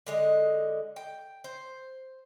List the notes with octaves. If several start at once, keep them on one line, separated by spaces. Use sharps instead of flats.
D3 G#3 D#5
G5
C5